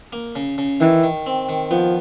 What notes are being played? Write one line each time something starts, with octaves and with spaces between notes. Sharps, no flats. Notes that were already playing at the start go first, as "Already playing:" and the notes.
A#3
C#3
C#3
D#3 E3
D#3
C4
D#3
F3 B3